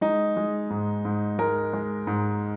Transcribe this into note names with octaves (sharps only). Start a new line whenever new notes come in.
G#3 D#4
G#3
G#2
G#2
G#3 A#4
G#3
G#2